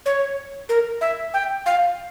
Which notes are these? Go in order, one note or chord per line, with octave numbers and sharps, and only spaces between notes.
C#5
A#4
E5
G5
F5